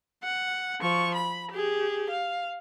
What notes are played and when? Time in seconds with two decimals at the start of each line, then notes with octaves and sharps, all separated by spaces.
0.23 F#5
0.81 F3 C#6
1.14 B5
1.51 G4 G#4
2.10 F5